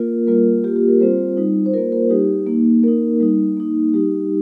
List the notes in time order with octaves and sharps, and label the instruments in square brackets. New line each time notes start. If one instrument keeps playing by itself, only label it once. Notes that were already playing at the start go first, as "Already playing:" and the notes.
Already playing: [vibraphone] A#3 F4 A#4
G3 A#3 F4 A#4
F4 G4
A#3
G4
A#4
G3 C4 F4 C5
G3 D#4
C5
A#3 F4 A#4
A#4
G3 D#4 G4
A#3 D#4
A#3 D#4 A#4
G3 D#4
A#3 D#4
G3 D#4 G4